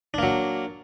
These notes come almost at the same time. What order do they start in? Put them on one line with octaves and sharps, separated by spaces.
D4 A#3 F#3